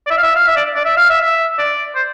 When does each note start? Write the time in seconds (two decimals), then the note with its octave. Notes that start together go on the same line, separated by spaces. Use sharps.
0.07 D5
0.11 E5
0.17 F5
0.23 E5
0.35 F5
0.48 E5
0.57 D5
0.76 D5
0.85 E5
0.97 F5
1.10 E5
1.21 E5
1.59 D5
1.95 C5